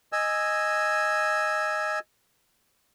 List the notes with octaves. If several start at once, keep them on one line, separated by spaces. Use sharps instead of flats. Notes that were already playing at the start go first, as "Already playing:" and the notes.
D#5 G#5 E6